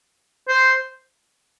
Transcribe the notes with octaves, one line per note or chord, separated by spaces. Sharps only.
C5